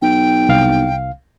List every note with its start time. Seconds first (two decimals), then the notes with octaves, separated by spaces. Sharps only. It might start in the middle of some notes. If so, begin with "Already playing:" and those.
0.02 B1 G5
0.49 C2 F5